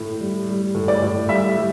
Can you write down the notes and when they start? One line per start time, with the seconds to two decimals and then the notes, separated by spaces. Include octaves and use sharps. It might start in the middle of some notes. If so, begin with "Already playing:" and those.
Already playing: A2
0.20 G3
0.48 G3
0.75 A2
0.88 D5
1.02 A2
1.29 G3 E5
1.57 G3